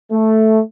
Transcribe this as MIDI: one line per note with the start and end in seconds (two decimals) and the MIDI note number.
0.10 0.59 57